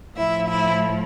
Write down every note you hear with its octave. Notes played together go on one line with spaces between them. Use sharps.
A2 F3 E4 E5
E4 E5